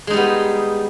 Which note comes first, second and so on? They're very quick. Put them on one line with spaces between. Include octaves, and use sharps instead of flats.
G#3 D#4 G3 B3